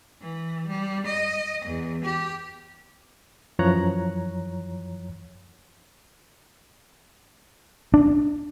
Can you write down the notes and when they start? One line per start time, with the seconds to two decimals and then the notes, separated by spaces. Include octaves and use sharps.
0.21 E3
0.67 G3
1.06 D#5
1.66 E2
2.04 G4
3.59 F#2 E3 F3 C#5 A#5 F#6
7.94 D4